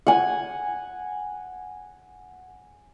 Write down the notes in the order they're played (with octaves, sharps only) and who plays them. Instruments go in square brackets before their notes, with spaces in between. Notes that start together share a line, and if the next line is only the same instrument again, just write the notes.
[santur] F#5 G#5